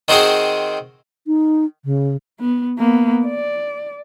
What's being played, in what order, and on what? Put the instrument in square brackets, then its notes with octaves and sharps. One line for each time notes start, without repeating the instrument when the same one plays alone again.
[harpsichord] D#3 C4 F#4 G#4 C5
[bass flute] D#4
C#3
[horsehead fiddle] B3
A#3 B3
D5